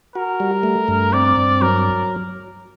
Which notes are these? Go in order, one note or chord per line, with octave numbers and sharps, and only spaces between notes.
F#4 A#4
G3
A3
G2
C4 D5
G2
F#3 A#4